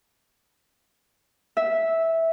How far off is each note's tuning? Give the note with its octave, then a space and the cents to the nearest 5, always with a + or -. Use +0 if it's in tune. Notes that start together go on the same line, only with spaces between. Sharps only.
E5 -10